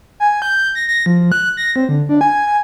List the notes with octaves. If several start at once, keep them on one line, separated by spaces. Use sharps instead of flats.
G#5
G6
A#6
A#6
F3
F#6
A#6
C4
D3
D4
G#5
G#5